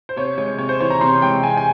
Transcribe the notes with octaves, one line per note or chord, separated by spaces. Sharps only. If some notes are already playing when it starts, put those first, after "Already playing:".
C5
C3 C#5
G#3 C#5
C3 C#5
C5
E3 C#5
A#5
C3 C6
G#3 G5
C3 G#5
G#5